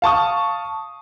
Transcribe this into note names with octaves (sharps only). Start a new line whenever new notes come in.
F5 A5 C#6 D#6